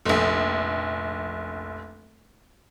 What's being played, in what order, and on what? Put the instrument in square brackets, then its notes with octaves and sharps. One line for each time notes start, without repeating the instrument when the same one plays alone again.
[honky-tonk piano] F1 A#1